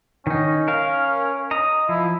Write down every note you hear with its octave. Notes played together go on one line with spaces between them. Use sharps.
D#3 C#4 D#4
A#4 F5
D#5 A#5
F3 E4